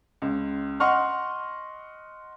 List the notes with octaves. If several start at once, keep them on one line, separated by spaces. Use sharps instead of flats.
C#2
D#5 F#5 C6 C#6 F6